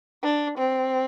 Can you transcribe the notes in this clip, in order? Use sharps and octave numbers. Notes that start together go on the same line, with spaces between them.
D4
C4